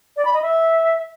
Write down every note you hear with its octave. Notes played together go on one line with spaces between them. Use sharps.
D5
B5
D#5
E5